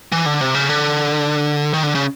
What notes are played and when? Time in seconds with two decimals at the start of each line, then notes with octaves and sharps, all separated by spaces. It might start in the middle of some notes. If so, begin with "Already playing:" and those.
0.12 E3
0.26 D3
0.41 C3
0.55 C#3
0.69 D3
1.73 D#3
1.83 D3
1.95 C#3